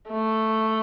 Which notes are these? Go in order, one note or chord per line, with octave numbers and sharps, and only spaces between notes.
A3